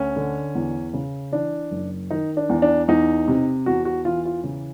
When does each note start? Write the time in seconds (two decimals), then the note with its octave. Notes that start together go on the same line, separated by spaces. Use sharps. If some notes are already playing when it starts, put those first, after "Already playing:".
Already playing: D2 C#4
0.16 D3
0.55 E2
0.93 C#3
1.32 E3 D4
1.71 F#1
2.10 D#3 D#4
2.37 D4
2.49 E2
2.62 D4
2.88 E2 D#4
3.28 C3
3.66 E2 F#4
3.85 F#4
4.05 E3 F4
4.25 F4
4.44 C#3